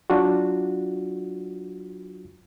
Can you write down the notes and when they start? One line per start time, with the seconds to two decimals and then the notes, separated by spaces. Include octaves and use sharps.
0.10 F#3 D4 F4 F#4